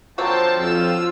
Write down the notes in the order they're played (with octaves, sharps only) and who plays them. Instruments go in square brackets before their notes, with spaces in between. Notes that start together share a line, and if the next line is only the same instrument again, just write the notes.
[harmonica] D3 F3 G5 [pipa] F#3 A#3 C4 [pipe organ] C5 A5
[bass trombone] F2 [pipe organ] F4 E6